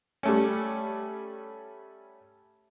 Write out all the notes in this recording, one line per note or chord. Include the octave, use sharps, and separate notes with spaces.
G3 A3 C#4